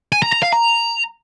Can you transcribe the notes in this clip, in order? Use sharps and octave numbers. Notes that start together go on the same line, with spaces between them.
G#5
A#5
A#5
F5
A#5